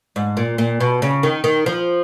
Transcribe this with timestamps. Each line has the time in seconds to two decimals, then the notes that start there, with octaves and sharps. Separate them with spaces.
0.16 G#2
0.37 A#2
0.58 A#2
0.80 B2
1.02 C#3
1.23 D#3
1.44 D#3
1.66 F3